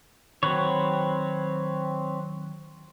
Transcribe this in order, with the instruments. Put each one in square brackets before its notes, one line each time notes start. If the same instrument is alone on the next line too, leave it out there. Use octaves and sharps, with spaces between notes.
[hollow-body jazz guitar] D#3 F#3 [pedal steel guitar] C4 B4 C#5